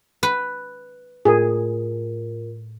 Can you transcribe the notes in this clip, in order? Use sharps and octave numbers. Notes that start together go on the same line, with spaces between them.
B4
A2 F4 G#4 A#4